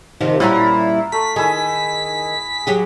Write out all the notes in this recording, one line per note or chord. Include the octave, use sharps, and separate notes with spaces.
D#2 C3 D#3 F3
A#2 G3 C#4 E4 F4 F#5 A#5
A3 B6
D#3 E4 G#4
F#3 G4 G#4